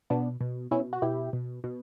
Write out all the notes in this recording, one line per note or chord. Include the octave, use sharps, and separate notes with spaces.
B2 B3 D4
B2
B2 C#4 E4
F#4
B2 E4 G4
B2
B2